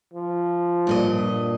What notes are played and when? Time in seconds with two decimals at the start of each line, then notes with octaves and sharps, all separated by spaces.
0.14 F3
0.87 G2 A#2 D#5